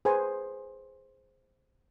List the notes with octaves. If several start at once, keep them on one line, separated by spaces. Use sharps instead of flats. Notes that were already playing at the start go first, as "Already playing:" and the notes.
G#4 B4 C5 G#5